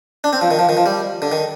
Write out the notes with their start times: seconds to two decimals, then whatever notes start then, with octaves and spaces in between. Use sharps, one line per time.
0.24 D4
0.33 C4
0.41 F3
0.51 D#3
0.59 F3
0.69 D#3
0.77 F3
0.86 G3
1.22 D3
1.32 D#3